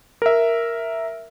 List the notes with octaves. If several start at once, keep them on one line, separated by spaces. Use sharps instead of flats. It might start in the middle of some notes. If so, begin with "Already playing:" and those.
A#4 E5